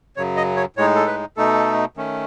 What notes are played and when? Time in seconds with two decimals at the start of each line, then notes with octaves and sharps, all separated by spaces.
0.17 F#2 C#3 F#3 C#5
0.37 D#5
0.57 C#5
0.76 A2 G#3 D#4 C#5
0.95 A4
1.07 B4
1.37 B2 A3 D#4 A4
1.97 D#3 A3 C#4